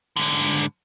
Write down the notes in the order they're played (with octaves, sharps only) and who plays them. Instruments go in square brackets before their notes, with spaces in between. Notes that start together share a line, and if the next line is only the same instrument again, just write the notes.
[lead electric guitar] G#2 D3